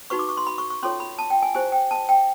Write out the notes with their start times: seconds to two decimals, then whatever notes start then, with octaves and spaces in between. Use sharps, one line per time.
0.10 D#4 F#4 B4 C#6
0.19 D6
0.29 C#6
0.37 C6
0.47 B5
0.58 C#6
0.70 C#6
0.83 C#4 F4 A4 C#5 C6
1.00 B5
1.18 A5
1.30 G5
1.42 G#5
1.54 E4 G4 C5 G#5
1.72 G5
1.91 A5
2.09 G5